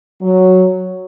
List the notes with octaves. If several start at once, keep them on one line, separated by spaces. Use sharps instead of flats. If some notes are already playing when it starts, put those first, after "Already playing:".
F#3